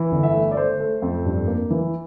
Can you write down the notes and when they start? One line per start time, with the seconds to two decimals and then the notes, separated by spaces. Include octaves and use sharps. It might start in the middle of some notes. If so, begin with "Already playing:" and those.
Already playing: E3
0.11 G1
0.23 E5
0.34 A3
0.51 D5
0.56 A3 C5
0.80 A3
1.02 F2
1.25 G2
1.47 A#3
1.70 E3